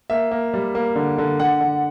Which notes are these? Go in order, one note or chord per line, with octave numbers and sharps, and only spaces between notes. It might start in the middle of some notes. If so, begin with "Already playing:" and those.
A#3 E5
A#3
G3
A#3
D3
D3
D3 F#5
D3